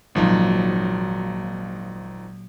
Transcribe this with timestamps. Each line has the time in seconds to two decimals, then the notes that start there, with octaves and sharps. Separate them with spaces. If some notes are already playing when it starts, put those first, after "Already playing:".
0.15 G#1 A#2 F3 F#3 D4 D#4